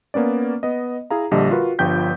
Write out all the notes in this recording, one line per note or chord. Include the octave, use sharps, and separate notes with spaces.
A#3 B3 C#4 D5
B3 D#5
E4 G#4 F5 A#5
A#1 D3 G3 G4 A4 D#5
F4 F#4 A#4 B4
G1 G2 F3 G5 G6 B6